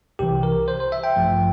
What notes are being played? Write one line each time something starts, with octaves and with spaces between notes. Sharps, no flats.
C2 C3 E3 G4
A#4
C5
C5
E5
G5
A1 G2 F3 A3